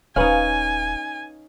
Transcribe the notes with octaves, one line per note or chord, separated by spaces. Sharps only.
D#1 C#4 D#4 B4 F5 G#5